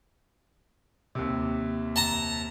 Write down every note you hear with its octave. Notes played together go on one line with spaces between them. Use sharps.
D#2 C3
A5 A#5